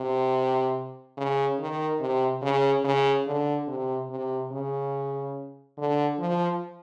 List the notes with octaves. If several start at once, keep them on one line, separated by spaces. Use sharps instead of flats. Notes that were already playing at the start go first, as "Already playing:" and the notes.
Already playing: C3
C#3
D#3
C3
C#3
C#3
D3
C3
C3
C#3
D3
F3